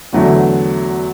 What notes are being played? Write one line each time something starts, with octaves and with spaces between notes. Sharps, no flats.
E2 D3 F#3 A3 E4